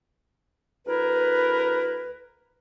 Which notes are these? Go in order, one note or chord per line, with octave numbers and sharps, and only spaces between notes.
D2 E4 A#4 B4